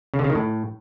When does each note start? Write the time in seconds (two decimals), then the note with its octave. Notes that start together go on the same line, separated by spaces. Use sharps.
0.14 C#3
0.19 D3
0.24 C#3
0.30 D#3
0.35 A2